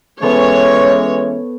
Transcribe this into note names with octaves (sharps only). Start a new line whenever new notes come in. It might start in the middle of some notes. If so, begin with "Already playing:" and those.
E3 G#3 B3 C#4 A4 C5 C#5